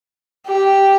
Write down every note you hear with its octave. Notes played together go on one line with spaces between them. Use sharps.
G4